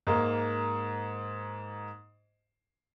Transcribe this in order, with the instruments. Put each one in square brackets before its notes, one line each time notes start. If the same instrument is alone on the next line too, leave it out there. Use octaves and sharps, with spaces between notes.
[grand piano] G#2 G#3 A#3